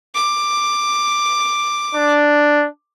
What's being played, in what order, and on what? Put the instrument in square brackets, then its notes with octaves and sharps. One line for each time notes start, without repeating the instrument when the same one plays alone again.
[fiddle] D6
[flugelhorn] D4